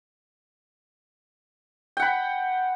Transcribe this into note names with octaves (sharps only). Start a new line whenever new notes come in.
F#5 G5 B5